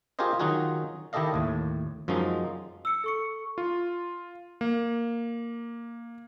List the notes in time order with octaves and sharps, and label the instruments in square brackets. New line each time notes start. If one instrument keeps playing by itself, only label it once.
[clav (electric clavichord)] F4 G4 G#4 A#4 C5 D#5
D#3 F#3 D#4 F4 F#4 G#4
D#3 E4 G4 A4 D#5 F5
D#2 A2
F#2 F3 F#3 G#3 D#4
[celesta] E6 C#7
A4 C#6 C#7
[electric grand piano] F4
A#3